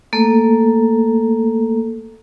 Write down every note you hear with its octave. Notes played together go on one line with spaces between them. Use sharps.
A3 A#3 A4